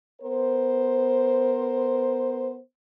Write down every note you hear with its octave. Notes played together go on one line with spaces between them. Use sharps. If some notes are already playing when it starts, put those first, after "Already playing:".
B3 A#4 C5